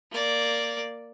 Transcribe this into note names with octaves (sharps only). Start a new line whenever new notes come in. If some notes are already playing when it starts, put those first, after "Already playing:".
A#3 D5